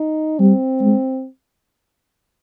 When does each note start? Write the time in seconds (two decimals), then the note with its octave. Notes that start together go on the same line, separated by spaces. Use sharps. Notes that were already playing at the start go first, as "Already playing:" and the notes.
Already playing: D#4
0.39 G3 C4
0.81 G#3